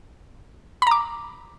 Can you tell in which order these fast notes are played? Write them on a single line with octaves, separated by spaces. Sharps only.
B5 A#5 D6